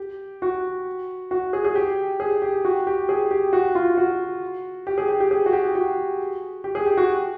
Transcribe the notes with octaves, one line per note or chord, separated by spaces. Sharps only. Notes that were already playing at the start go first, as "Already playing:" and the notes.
Already playing: G4
F#4
F#4
G#4
G#4
G4
G#4
G4
F#4
G4
G#4
G4
F#4
F4
F#4
G4
G#4
G4
G4
G#4
F#4
G4
F#4
G4
G#4
G4
F#4